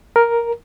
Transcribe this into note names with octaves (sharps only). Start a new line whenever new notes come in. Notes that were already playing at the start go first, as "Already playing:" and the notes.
A#4